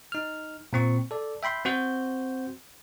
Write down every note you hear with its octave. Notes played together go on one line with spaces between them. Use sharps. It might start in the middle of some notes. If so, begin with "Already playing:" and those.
D#4 F6
A#2 C4 C#6
A4 D5
E5 G5 B5 C6
C4 F#4 C5 G6